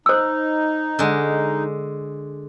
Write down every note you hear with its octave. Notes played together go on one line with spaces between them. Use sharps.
D#4 C5 E6
D3 G#3